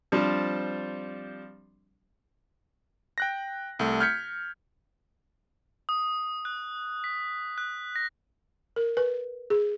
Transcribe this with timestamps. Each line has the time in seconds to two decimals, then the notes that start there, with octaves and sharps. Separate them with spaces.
0.12 F3 G3 C4 D4
3.18 G5 F#6 A#6
3.79 C2 A3
4.00 F6 G6 G#6 B6 C#7
5.89 D#6
6.45 F#6
7.04 B6
7.58 F#6
7.96 A#6
8.76 A#4
8.97 B4
9.50 G#4